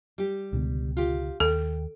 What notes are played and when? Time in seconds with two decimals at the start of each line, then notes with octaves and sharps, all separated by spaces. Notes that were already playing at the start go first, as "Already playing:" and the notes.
0.18 G3 G4
0.53 C#2 B2 D3
0.97 F4 G4
1.40 D#2 A4 G5